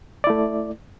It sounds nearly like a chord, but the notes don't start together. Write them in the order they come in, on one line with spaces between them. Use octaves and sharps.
D5 E4 A3